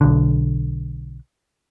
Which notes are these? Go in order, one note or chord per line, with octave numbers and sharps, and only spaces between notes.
B1 D3